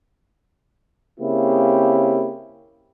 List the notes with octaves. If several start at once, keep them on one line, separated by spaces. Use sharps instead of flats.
C#3 A#3 C4 E4 G4